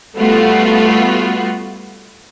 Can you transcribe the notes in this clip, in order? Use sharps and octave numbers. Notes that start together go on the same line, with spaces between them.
G3 A3 B3 F4 F#4